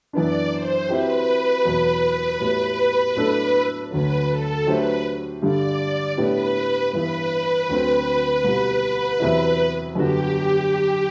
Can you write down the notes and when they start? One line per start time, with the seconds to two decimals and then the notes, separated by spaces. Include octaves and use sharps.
0.13 F#2 E3 B3 D4 D5
0.51 C5
0.89 F#3 C4 E4 G4 B4 C5
1.64 E2 B2 F#3
2.40 A2 G3 B3 F#4
3.15 A2 F#3 B3 D4 A4
3.91 D2 D3 F#3 B4
4.29 A4
4.66 F#3 A3 D4 G4 B4 C5
5.42 G2 D3 G3 D5
6.17 A2 G3 B3 D4 G4 B4
6.93 G2 E3 B3 B4
7.69 D2 D3 F#3 C4
8.44 C2 B2 G3
9.20 E2 C3 F#3 B3 E4
9.95 F#2 D3 G3 B3 F#4 G4